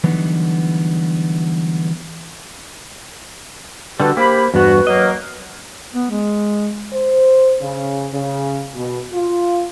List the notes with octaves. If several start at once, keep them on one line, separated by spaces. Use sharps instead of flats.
D3 E3 F#3 G3 B3 D#4
D3 G3 F#4 A4 B4
A#3 G4 C5 B5
E2 G2 B3 F#4 B4
F#3 A#3 D#5
B3
G#3
C5
C#3
C#3
B2
F4